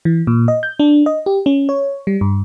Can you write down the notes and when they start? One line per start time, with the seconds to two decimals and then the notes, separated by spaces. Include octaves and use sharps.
0.05 E3
0.27 A#2
0.48 D#5
0.63 G6
0.79 D4
1.06 D#5
1.26 G4
1.46 C#4
1.69 C#5
2.07 G3
2.21 G2